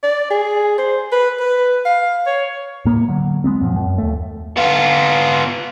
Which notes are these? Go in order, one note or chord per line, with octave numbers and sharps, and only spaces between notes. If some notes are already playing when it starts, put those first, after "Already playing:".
D5
G#4
C5
B4
B4
F5
C#5
A2 A#3 B3
D3 F#3
G#3 B3 C4
F#2 A#2 F3
F#2
D#2 A3
B3 F4